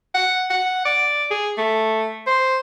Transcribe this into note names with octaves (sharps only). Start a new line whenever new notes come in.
F#5
F#5
D5
G#4
A3
C5